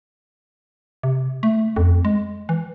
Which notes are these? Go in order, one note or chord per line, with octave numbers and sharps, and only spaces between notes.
C3
A3
F2
G#3
E3